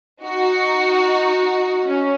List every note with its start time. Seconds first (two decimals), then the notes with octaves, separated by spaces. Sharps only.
0.24 D#4 F#4
1.86 C#4